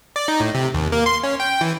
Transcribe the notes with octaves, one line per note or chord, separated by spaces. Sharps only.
D5
D#4
A2
C3
D#2
A#3
C6
C#4
G5
E3